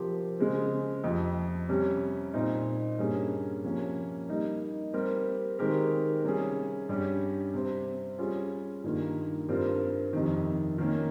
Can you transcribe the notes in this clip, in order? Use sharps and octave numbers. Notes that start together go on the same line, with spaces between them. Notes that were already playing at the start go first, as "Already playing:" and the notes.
Already playing: C3 F3 C4 G4 A#4
C#3 G#3 C4
F2 C3 F3
C3 G3 C#4
A#2 G3 C4 D#4
G2 G3 A#3 C#4 G#4
C3 F3 A#3 C#4
G3 A#3 D#4
G3 C4 G4 A#4
D#3 G#3 C4 G4 A#4
C3 G3 C#4 G#4
G2 G3 C#4 G4
C3 G3 C4
G3 C#4 F4 G#4
G2 D#3 A#3 F4
G2 G3 C4 F4 A#4
F2 C3 D#3
D#3 A#3 C#4